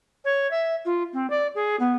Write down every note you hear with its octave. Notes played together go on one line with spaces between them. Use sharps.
C#5
E5
F4
C4
D5
G#4
B3